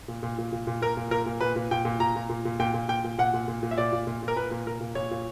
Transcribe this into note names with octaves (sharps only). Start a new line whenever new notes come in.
A#2
A#2
A#2
A#2
A#2
A#2 A#4
A#2
A#2 A#4
A#2
A#2 B4
A#2
A#2 G5
A#2
A#2 A#5
A#2
A#2
A#2
A#2 G5
A#2
A#2 G5
A#2
A#2 F#5
A#2
A#2
A#2
E5
A#2 D5
A#2
A#2
A#2
A#4
A#2 B4
A#2
A#2 A#4
A#2
A#2 C#5
A#2